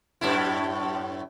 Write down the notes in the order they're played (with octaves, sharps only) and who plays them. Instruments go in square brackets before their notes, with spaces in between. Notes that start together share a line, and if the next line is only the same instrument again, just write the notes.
[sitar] F#2 A2 E4